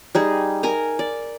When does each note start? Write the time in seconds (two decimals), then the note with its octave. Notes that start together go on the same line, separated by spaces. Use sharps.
0.15 G3 D#4 G#4
0.63 A#4 G#5 A#5
0.99 D5